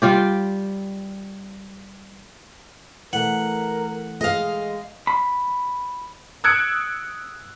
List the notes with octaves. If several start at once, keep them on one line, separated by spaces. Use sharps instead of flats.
G3 F4 G4
E3 A3 A#4 F#5
G#3 D#5 F5
B5
D#6 E6 F#6 G#6 C#7 D7